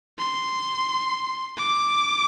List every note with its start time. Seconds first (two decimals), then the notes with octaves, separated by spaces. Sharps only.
0.18 C6
1.57 D6